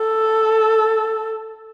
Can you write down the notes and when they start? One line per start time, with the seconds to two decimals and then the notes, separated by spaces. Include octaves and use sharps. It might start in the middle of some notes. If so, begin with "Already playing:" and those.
Already playing: A4